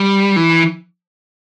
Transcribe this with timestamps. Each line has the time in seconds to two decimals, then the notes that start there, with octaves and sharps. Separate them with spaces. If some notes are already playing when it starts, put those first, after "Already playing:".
Already playing: G3
0.36 E3